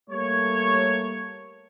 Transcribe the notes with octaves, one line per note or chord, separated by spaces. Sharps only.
G3 A3 A#3 A4 C#5